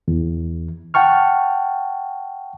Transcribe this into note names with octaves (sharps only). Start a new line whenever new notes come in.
E2
F#5 G5 A5 C#6 F6